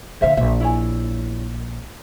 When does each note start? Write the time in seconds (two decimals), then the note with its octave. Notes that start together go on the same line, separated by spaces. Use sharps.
0.21 A#1 D3 C5 E5 F5
0.37 A#1 E5
0.60 E4 C#5 G#5